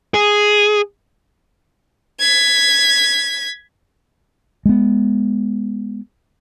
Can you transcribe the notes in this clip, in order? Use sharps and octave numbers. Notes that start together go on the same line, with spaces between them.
G#4
G#6 B6
G#3 B3